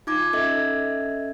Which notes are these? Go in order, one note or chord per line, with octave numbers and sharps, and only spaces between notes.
D#4 F4 D6 G#6
C#4 A4 D#5 E5 G#6